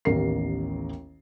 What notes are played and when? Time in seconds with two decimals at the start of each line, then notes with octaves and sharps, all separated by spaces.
0.05 A1 D#2 A#3 B3 A#4 C7